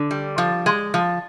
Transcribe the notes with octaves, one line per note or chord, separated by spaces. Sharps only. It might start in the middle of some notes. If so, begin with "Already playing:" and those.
Already playing: D3
G3
F3
G#3
F3